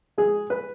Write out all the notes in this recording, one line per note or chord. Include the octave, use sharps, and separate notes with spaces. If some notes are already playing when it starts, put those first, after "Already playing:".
G#3 G#4
B4